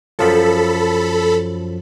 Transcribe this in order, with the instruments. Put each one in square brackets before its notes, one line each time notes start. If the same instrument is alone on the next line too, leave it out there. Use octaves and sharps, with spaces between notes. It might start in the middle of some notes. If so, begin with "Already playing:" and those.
[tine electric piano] F#2 F3 F#3 [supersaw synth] A4 B5